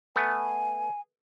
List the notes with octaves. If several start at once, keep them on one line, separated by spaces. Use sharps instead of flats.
A3 B3 G#5